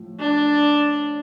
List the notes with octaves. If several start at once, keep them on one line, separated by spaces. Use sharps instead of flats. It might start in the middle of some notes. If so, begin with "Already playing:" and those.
Already playing: A2 F3 A3
D4